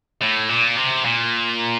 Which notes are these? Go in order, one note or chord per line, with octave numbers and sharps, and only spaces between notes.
A2
A#2
C3
A#2